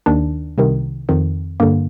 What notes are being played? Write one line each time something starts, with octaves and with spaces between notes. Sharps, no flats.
D#2 D#3 D4
C2 C3 D#3
F2 D#3
G2 D3 A#3